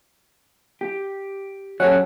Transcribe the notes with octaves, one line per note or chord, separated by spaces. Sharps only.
G4
F#3 C#4 G4 A4 F#5